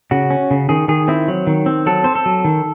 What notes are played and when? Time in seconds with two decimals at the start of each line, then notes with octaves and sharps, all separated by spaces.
0.11 C#3 F#4
0.30 C#4
0.51 C#3
0.69 D#3 G#4
0.88 D#3 G#4
1.08 C4 E4
1.28 F#3
1.47 D#3
1.66 C4
1.86 F#3 A4
2.04 C4 C5
2.15 A4
2.26 F#3
2.45 D#3